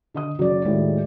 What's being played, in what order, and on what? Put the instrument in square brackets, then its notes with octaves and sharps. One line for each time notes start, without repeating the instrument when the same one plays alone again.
[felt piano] D3 D#5 D#6
[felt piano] F#1 F#3 [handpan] F#4 D5
[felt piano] D#2 A2 [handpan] G#3